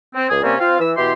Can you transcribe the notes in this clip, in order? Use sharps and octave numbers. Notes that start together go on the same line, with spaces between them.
C4
C#2 G#4
C3 G3 A#3 C4 C#4
C4 F4 F5
E3 E6
B2 E3 E4 G4 C6